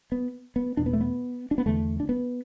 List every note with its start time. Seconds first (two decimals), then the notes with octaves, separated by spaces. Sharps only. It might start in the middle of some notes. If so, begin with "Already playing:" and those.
0.12 B3
0.56 B3
0.77 E2 B2 D4
0.86 B3
0.93 A3
1.01 B3
1.51 D4
1.58 B3
1.66 E2 D3 A3
2.00 D4
2.09 B3